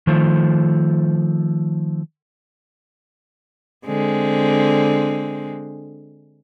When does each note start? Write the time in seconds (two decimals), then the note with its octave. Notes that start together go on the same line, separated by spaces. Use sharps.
0.07 D#3 F3 A3 C5
3.85 D3 G#3 C4